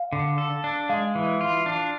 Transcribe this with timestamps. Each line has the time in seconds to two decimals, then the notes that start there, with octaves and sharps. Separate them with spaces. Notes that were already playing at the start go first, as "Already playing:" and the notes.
Already playing: F5
0.13 D3
0.38 A4
0.64 D4
0.89 G#3 F5
1.15 E3
1.41 F4
1.66 D4